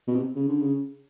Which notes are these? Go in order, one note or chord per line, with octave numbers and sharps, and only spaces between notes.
B2
C3
C#3
D3
C#3